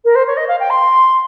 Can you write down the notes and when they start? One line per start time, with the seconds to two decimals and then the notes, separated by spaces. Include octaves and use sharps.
0.04 A#4
0.15 C5
0.27 C#5
0.36 D#5
0.48 F5
0.59 G5
0.70 C6